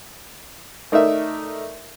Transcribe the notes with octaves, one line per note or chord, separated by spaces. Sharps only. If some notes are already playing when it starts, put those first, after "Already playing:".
A3 D#4 A#4 D5 E5